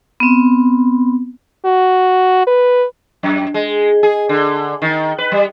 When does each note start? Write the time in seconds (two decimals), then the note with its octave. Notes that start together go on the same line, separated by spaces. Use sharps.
0.20 B3 C4
1.65 F#4
2.47 B4
3.23 F#2
3.54 G#3
4.03 G#4
4.29 D3
4.82 D#3
5.18 B4
5.32 G3